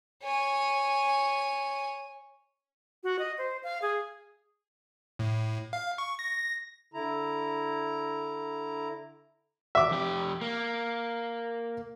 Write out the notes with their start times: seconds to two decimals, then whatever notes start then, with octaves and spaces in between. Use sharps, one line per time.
0.24 C#5 G#5
3.04 F#4
3.19 D#5
3.38 C5
3.63 F5
3.82 G#4
5.19 A2
5.73 F5
5.98 C#6
6.19 A#6
6.94 D3 E4 A#5
9.75 E5 D6
9.91 F2 G4
10.41 A#3